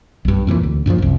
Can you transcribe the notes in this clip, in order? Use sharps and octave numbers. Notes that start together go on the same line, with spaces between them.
B1 G2
F2 A#2 D3 E3
D2
G2 A#2 D3 F3
F#1 C2